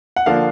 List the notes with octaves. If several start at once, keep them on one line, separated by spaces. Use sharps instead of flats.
F#5
D3 F3 A#3 F5